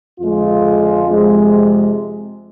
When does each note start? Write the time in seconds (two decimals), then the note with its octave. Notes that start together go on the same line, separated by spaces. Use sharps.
0.20 F2 D3 G#3 F4
1.07 F2 C3 G#3